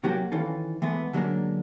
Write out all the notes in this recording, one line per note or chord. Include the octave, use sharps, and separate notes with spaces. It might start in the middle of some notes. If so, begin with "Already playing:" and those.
C3 F#3 A#3 C#4 F#4 G4
D#3 E3 C#4 F4 A4
E3 G#3 A3 B3
D3 F#3 G#3 A#3 C#4 D4